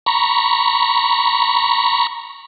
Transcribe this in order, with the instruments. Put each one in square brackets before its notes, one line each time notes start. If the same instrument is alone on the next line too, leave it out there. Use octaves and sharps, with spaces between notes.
[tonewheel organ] A#5 B5 C#6